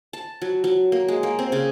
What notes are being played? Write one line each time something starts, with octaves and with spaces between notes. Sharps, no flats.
A5
F#3
F#3
A#3
G#3
A#3
C4
C#3